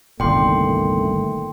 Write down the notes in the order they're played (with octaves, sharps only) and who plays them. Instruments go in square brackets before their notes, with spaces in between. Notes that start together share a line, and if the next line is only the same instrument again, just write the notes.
[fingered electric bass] G1 C2 [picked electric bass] A#2 D#3 [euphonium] A3 [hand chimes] G5 C6 D6